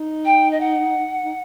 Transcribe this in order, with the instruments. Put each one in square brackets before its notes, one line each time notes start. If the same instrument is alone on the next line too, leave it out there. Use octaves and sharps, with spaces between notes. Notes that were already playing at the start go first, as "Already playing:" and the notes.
Already playing: [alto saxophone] D#4
[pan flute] G5
D#5
F#5
[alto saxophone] D#4